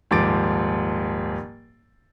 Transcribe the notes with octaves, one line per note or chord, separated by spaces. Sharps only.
D#1 G#2 F3 D6 A6 D7